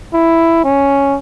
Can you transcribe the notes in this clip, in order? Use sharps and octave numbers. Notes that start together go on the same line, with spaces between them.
E4
C#4